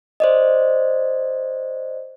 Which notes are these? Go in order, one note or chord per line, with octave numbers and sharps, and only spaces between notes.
C5 D5 D#5